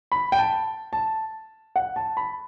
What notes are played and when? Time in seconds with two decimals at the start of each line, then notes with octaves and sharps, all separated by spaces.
0.12 B5
0.32 G5
0.38 A5
0.93 A5
1.76 F#5
1.96 A5
2.17 B5